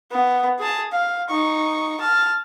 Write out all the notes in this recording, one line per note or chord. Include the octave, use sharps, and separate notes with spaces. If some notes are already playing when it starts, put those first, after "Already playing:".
B3
G#4 A5
F5
D#4 C#6
A5 F6